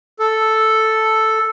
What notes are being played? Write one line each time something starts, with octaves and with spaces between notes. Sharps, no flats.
A4